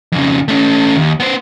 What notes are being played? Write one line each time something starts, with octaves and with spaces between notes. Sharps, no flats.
F2 C#3
A3 C#4
D#2
B3 C5